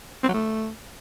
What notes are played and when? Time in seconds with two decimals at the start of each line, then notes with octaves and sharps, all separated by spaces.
0.23 C4
0.28 F#3
0.34 A3